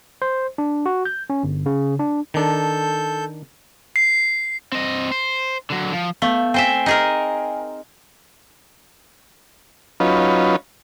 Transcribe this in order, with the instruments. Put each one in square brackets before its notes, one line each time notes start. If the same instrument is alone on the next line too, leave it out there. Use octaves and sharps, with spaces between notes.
[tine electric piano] C5
D4
F#4
G6
C#4
G1
C#3
D4
[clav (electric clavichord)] D#3 D4 [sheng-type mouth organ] A4 G6
[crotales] C7
[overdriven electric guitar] C4 D#5
C5
D3 F#3
F3
[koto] A3 [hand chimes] B3 F5 G6
[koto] C4 C5 E5 [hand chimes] G5 G#5
[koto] D#4 G#4 A#4
[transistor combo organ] F#3 C#4 D#4 F4 B4